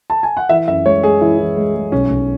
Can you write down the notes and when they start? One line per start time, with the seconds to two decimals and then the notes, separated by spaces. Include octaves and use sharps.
0.10 A5
0.23 G#5
0.37 F#5
0.49 E3 E5
0.68 F#2 E5
0.86 G#3 C#5
1.03 G#3 G#4
1.21 E3 E4
1.39 E3
1.57 G#3
1.75 G#3
1.92 B1 C#4
2.10 B1